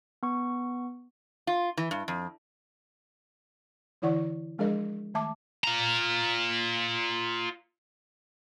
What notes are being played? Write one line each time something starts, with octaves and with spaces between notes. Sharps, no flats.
B3 C#6
F4
E3
G2
F2
D3 E3 E4 D5 F#5 C#6
F3 G#3 D4 G#4 A#4 D#5
D#3 A3 E5 A5 D6
F4 A#5